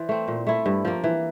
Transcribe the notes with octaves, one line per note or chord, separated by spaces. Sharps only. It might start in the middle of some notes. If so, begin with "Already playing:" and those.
Already playing: E3 C5 D5
A3 C4
A#2
A3 E4
G2
F3 A#3
E3